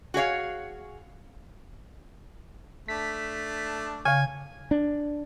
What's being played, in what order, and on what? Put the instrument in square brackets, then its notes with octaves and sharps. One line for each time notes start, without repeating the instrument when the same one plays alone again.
[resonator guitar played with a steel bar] F#4 G#4 C#5 F5
[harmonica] A3 D4 [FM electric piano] B6
[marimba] C#3 [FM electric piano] F5 C#6 [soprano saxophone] G#5
[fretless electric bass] D4